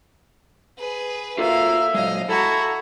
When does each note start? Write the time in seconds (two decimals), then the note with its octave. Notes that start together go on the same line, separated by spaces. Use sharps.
0.78 G#4 B4
1.38 A#3 F4 F#4 A4 E5 F5
1.94 A#2 F#3 G#3 D#5 F5
2.29 E4 F#4 A4 A#5